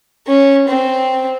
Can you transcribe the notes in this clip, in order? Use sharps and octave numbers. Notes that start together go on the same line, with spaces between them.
C#4
C4